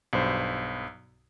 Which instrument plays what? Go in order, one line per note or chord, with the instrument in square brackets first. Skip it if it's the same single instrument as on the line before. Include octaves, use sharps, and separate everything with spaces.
[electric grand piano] B1 G2 C5